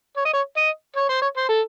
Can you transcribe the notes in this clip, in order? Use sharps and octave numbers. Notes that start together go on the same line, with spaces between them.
C#5
D#5
C#5
D#5
C#5
C5
C#5
C5
A4